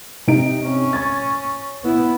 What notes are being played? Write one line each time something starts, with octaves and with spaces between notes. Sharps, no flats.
C3 D#4 D7
C#4
C#6 G#6 A6
B3 E4